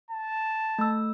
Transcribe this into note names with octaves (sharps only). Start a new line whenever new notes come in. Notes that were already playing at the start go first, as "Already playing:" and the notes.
A5
A3 E6